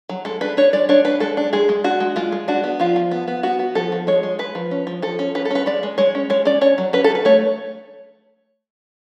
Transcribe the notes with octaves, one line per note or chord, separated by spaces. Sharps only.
F#3
G#3 A4
D4 B4
D4 C#5
G#3 D5
D4 C#5
D4 B4
G#3 A4
D4
G#3 G#4
G#3
D4 F#4
G#3
G#3 F4
G#3
D4 F#4
B3
F3 F4
F3
B3
B3
B3 F#4
B3
F3 A4
F3
G#3 C#5
G#3
G#3 B4
F3
C#4
F3
F3 A4
C#4
C#4 B4
A4
C#4 B4
G#3 D5
G#3
G#3 C#5
C#4
G#3 C#5
C#4 D5
C#4 C#5
F#3
C#4 B4
A4
F#3 B4
A3 C#5